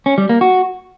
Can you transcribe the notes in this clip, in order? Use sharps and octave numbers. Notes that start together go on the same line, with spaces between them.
C#4
G3
A#3
F#4